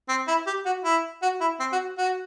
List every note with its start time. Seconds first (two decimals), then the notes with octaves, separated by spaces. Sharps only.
0.09 C4
0.28 E4
0.46 G4
0.66 F#4
0.84 E4
1.22 F#4
1.41 E4
1.60 C4
1.72 F#4
1.98 F#4